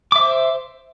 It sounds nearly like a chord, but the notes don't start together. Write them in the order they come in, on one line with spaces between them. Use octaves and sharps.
D6 E5 C5